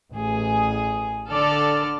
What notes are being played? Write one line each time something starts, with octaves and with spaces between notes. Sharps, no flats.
A1 G#4
D3 A4 D5 F6